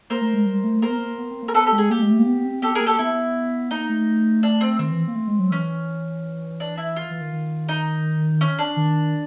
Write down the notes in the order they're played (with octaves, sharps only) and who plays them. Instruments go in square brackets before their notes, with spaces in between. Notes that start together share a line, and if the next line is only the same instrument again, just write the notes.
[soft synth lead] A#3 [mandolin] A#4 C5
[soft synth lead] A3
G#3
G3
A3
[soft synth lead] A#3 [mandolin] A#4 C5
[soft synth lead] B3
A#3
B3
C4
A#3
[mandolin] A#4
[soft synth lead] B3 [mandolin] A4 B4
[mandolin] G4 A4
[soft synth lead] G#3
[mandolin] G#4
[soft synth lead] A#3 [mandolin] G4
[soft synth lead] G#3
A3
A#3
B3
C4
[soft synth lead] B3 [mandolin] G4 A4
[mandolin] G#4 A#4
[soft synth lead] A#3
[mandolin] G4 A4
[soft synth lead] B3 [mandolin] E4
[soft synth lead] A#3 [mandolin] D#4
[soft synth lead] A3
[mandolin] D4
C4
[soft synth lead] D#3 [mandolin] C4
[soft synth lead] E3
A#3
A3
G#3
F#3
[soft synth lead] E3 [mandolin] C#4
[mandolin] D4
E4
F4
[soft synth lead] E3
D#3
D#3
[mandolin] D#4
C#4
D4
[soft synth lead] D#3